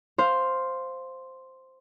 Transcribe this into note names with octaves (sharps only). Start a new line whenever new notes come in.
C5 F5